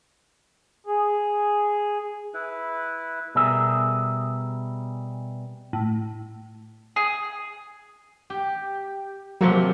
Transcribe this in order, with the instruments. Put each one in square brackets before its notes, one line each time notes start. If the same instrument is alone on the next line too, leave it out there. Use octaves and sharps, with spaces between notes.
[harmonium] G#4
[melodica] E4 B4
[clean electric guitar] B2 G3 G#4 A#4 E5
[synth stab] A2
[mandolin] G#4
[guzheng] G4
[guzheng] C3 F3 A#3 [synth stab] F#3